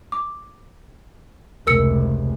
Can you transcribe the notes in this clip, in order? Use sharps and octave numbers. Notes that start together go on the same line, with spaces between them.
D6
F1 C#2 A#4 E6 C#7